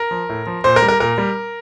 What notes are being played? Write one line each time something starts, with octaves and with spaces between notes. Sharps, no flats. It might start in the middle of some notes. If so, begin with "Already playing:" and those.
Already playing: A#4
F3
A2
F3
A#2 C5
A#4
G3
A#4
A#2 A#4
G3